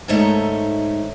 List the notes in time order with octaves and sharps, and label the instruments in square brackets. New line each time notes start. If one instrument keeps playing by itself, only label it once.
[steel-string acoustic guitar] G#2 D#3 A3 D#4 C#5 E5